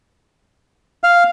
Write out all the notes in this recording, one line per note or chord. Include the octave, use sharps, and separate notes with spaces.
F5